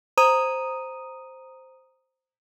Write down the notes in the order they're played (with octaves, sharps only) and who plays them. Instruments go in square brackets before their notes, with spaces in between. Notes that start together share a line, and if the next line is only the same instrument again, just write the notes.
[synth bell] C5 A#5 D#6 D#7